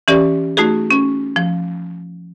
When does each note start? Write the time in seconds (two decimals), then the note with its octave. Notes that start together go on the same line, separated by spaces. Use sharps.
0.08 E3 C#4 G4 D5
0.57 A3 D#4 F#4 G#4
0.91 C#4
1.36 F3